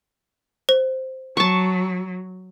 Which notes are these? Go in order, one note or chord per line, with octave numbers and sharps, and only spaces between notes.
C5
F#3 A5 C#6